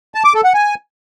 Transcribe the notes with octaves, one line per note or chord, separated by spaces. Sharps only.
A5
D6
A4
F#5
G#5